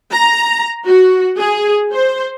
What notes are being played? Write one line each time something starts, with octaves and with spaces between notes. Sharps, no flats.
A#5
F#4
G#4
C5